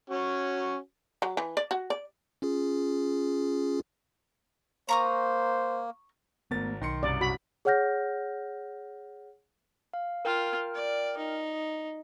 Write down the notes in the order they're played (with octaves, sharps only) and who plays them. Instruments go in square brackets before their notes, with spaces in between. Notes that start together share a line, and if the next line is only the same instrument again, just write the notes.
[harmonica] C#4 F#4
[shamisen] F#3
E3
D5
F#4
D5
[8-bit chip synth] C#4 F4 G#4
[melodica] A#3 [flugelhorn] C5 [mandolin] A#5 C#6 D#6
[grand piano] G#1 A#4 A6 [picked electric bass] A3 B3
[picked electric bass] B1 [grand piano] D#3 C6 C#7
[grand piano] C2 F#2 [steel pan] D5
[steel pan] F#4 B5
[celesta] G#4 C#5 F#5 F6 G6 A#6
[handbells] F5
[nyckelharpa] F4 [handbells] A#4 G5 F6
[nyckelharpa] D5
D#4